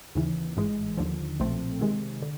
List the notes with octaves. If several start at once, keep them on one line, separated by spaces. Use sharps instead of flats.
D#2 C#3 E3
A1 G#2 E3 G#3
D#2 D3 F3
B1 A#2 F3 A3 C4
C3 D#3 G#3
D3